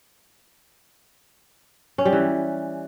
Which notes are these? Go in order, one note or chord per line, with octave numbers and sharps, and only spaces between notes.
C#4
G3
E3